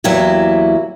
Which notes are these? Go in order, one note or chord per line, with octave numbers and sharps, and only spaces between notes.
E2 F#3 A#3 E4 G4